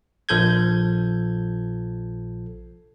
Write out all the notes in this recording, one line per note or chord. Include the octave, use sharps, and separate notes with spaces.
A#1 F3 A4 G6 G#6